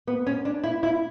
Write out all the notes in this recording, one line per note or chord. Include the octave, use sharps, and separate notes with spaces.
B3
C#4
D4
E4
E4